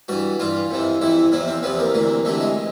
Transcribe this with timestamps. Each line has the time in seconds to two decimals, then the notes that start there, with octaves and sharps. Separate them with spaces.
0.08 G2 E3 F#4
0.40 G2 E3 F4
0.71 F2 C3 E3
1.01 F2 C3 E3 E4
1.32 E2 C3 F3 E4
1.48 C4
1.63 E2 C3 F3 B3
1.79 A#3
1.94 D2 C3 E3
2.25 D2 C3 E3 A3
2.40 G#3